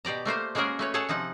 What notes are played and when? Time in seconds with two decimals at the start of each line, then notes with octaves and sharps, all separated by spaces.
0.05 B2 G4 D5 A#5
0.25 A3 A#3 F4 C5
0.55 G#3 A#3 C#4 F#4 G#4 A#4
0.79 A3 B4 C#5
0.94 G#4 A4 C#5 F#5 A5
1.09 C3 F3 D#4 F#5